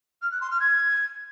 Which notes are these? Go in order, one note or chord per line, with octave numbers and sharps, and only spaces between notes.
F6
F#6
C6
F6
G#6